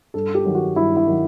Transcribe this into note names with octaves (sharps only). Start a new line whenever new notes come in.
G2 A4
G4
D#3 F#3
F#4
G2 E4
E4
D#3 F#3